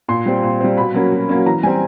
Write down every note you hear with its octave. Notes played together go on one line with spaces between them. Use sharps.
A#2 C6
G3 C4
A#2
G3 C4
B2 B5
F#3 A#3 C#4
B2
F#3 A#3 C#4
E3 A#5
G3 C4 G#5